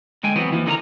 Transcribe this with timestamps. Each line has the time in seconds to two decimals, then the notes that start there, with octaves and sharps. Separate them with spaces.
0.23 D3 G#3 G5 G#5
0.36 E3 F#3 B3 C4
0.51 D#2 E3 F3
0.66 D3 D#4 G#4 A#4 A#5